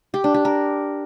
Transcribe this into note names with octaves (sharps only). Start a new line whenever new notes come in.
G4
D4
G4
A#4